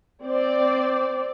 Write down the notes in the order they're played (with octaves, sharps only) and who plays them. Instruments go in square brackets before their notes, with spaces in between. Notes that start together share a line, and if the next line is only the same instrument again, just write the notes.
[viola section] C4 D5